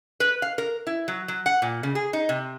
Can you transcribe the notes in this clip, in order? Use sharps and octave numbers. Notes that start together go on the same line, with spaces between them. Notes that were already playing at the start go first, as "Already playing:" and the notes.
B4
F5
A#4
E4
F#3
F#3
F#5
A#2
C#3
G#4
D#4
C3